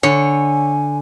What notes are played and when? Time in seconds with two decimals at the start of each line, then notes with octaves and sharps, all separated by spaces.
0.03 D3 C#5 G#5